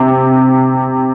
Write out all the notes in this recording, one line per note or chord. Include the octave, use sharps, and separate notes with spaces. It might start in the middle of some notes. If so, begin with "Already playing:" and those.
Already playing: C3